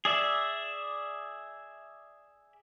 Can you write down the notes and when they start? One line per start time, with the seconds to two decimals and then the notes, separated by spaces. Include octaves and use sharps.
0.05 G#4 D5 E5